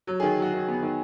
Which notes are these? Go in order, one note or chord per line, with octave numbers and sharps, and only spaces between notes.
F#3 C#5
D#3 G#4
F#3 F#4
D#3
B3
D#3